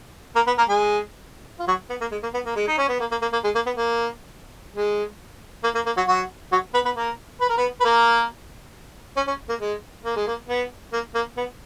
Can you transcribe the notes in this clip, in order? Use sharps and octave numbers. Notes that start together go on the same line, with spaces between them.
A#3 A#4
B3 B4
A#3 A#4
G#3 G#4
F4
F#3 F#4
B3
A#3
G#3
A#3
B3
A#3
G#3
D#4
C#4
B3
A#3
A#3
A#3
A#3
G#3
A#3
B3
A#3
G#3
A#3
A#3
A#3
F#3 F#4
F#3 F#4
F#3 F#4
B3 B4
B3 B4
A#3 A#4
B4
A#4
B3 B4
B4
A#3 A#4
C#4
C#4
A#3
G#3
A#3
G#3
A#3
B3
A#3
A#3
B3